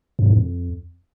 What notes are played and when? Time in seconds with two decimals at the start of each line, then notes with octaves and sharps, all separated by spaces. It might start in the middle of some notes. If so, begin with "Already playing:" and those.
0.19 F#2
0.26 G2
0.33 F2